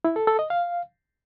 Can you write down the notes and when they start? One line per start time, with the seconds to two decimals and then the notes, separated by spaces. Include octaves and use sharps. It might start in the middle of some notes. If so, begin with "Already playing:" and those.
0.05 E4
0.16 A4
0.27 A4
0.39 D#5
0.50 F5